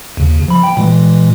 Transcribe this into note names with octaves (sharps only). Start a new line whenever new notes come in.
D#2 C#3
F3 B5
G5
A#2 E3 G#3